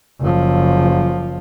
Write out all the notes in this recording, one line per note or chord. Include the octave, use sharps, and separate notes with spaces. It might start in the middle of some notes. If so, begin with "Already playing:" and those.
F#1 F3